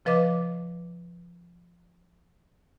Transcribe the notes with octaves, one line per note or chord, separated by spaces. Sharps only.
C#3 F3 B4 D#5 D6